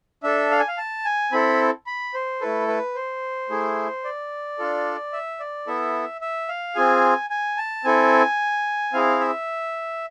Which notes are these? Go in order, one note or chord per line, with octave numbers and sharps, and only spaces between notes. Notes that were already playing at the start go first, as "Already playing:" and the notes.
D4 A4 E5
F5
G#5
F5
A5
G#5
C4 E4 A4 B5
B5
C5
A3 E4 A4 B4
B4
C5
A3 E4 G#4
D5
D4 F4 A4
E5
D5
B3 E4 A4 E5
E5
F5
C4 F4 G#4 G#5
G#5
A5
C4 E4 A4 G#5
C4 E4 G#4 F5
E5